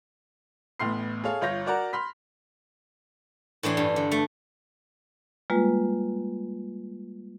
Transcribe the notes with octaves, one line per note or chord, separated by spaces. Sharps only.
A1 A2 B3 C6 F6 C7
G#4 A4 C#5 F5
G1 F4 C#5 G6 A#6
F#4 A#4 D5 F#5 A#5
B5 C6 F6 B6
A2 E3 D4 C6
G2
D3
A3
G3 G#3 A#3 F4 B4